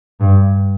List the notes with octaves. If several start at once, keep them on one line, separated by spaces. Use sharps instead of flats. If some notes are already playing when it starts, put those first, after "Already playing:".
G2